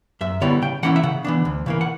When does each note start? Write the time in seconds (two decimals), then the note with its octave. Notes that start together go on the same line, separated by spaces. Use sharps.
0.21 F#2 E5
0.41 D3 G3 B3 E4 C#5
0.62 C#3 G5
0.83 E3 A#3 C#4 E4 F#5
0.96 E5
1.03 C#3 F#5
1.25 E3 B3 D4
1.45 D2
1.66 C#3 E3 A#3
1.81 F#5